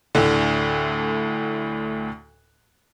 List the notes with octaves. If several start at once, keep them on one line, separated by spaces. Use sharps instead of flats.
D2 A2 D3